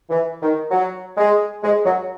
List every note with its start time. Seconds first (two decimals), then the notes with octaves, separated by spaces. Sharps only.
0.10 E3
0.41 D#3
0.71 F#3
1.17 G#3
1.63 G#3
1.85 F#3